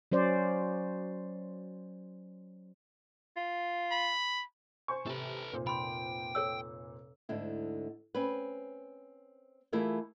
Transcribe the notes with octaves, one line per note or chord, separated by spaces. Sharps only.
F#3 C#4 C5 D5
F4
B5
C5 G#5 C#6
C3 A4 B4
F1 A#2 C5
G5 B5 C6
A4 C#5 E6
D2 G#2 D3 E4
C4 C#4 B4
E3 A3 E4 F4 G#4 A#4